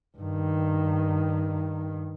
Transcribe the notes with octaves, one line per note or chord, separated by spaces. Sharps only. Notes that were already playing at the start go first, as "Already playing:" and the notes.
G2 D#3